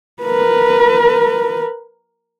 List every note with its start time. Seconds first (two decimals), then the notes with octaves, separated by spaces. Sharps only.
0.23 A#4 B4